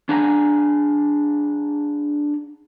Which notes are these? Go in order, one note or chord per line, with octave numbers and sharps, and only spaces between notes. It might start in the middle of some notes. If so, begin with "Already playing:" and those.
D4 G#4 F#5 G#5 A#5